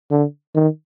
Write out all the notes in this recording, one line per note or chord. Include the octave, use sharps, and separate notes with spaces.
D3
D#3